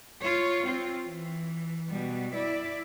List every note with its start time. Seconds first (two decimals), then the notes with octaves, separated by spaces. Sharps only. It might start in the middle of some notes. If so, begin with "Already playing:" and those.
0.21 F4 C#5
0.66 C4 F4
1.06 E3
1.89 B2 G3
2.34 E4 D5